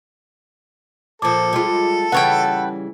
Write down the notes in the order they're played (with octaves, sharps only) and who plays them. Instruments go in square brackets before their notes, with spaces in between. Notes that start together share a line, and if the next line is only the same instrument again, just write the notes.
[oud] A#2 F3 [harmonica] A4 [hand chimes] D6
[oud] G3 G#3 F4
[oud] C#3 E3 G3 [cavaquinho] B4 C#5 G5 [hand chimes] F#5